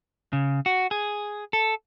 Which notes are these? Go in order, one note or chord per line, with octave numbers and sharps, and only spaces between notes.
C#3
F#4
G#4
A4